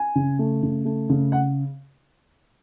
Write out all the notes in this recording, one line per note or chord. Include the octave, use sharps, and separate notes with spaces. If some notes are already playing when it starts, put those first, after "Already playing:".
Already playing: G#5
C#3
A3
C#3
A3
C#3
F#5